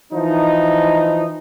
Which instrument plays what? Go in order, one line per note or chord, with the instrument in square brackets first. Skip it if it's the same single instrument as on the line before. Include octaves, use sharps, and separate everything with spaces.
[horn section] E3 F3 D#4